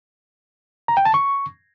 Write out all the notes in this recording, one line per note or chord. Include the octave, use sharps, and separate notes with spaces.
A#5
G5
A5
C#6